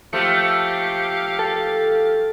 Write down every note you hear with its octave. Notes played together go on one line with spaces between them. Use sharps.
F3 A3 G4 F5 C#7
A4